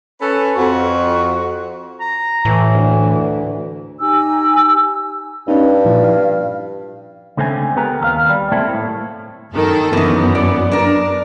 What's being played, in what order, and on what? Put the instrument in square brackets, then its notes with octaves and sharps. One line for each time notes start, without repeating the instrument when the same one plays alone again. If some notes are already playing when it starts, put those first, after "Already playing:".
[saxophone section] C#4 A4 B4
F2 F#4
[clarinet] A#5
[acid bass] A2 [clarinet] E3
[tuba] D2
[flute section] D#4 G4 G#5 E6
[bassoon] G2 [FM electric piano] C#4 D#4
[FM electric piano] A#2 F3 E4
F5
[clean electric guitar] C#2 D3 A3 C4 A4 G#5
B3 G4 A#4
D#2 A4 F5
G3
A3 A#3 C4 E4 A4
A2
[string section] F#2 D#3 A4
[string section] F#2 B3 [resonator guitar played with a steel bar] D#3 E3
[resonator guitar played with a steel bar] D5
D4 A#4